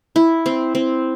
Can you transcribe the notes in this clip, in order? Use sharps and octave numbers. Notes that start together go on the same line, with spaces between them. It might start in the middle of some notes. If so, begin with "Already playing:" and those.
E4
C4
C4